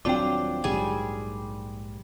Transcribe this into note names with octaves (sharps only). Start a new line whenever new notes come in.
D#1 F#3 C4 D4 F4 G5 D6
A#1 G#2 G3 G#4